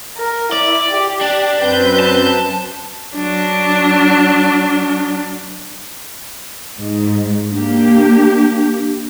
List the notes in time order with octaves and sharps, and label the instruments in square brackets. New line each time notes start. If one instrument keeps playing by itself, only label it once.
[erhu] A#4
[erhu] E4 [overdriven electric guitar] D5
[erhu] G4
[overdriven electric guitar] D4
[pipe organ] F#2 C4 G6 [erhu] B4
[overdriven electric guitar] A5
[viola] F#3 D4
[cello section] G#2
[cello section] A#3 G4 [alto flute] D4